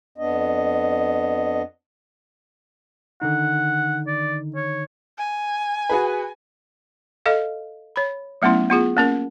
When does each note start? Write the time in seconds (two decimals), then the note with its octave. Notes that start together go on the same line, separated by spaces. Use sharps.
0.18 F2 B3 D4 D#5
3.22 D3 D#3 D#4 F#5
4.07 D5
4.55 C#5
5.18 G#5
5.90 F#4 G#4 B4
7.26 A4 D#5 F5
7.96 C#5 B5
8.42 F#3 A3 B3 C#4 E4
8.70 B3 F4 G#4
8.97 A#3 C#4 A#4